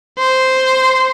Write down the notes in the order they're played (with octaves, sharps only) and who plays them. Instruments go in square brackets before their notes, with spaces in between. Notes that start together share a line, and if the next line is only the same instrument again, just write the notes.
[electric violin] C5